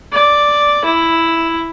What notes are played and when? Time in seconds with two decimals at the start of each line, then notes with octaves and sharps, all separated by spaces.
0.13 D5
0.85 E4